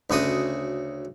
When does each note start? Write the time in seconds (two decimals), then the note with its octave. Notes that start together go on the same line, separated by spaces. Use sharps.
0.10 D2 C#3 F#4 D#6